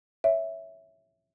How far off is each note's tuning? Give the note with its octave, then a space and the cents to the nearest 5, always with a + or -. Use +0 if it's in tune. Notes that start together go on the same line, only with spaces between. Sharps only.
C#5 +0 E5 +0